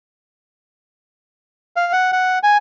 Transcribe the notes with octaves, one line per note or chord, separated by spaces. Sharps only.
F5
F#5
F#5
G#5